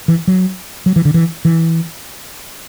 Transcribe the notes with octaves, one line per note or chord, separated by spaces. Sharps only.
E3
F#3
F#3
E3
D3
E3
E3